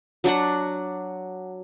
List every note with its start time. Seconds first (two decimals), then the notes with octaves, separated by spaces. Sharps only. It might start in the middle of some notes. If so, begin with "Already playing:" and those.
0.24 F#3 D4 F#4 F#5